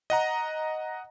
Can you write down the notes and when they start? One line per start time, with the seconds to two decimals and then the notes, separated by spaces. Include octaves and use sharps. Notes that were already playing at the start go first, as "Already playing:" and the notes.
0.10 D#5 F#5 A#5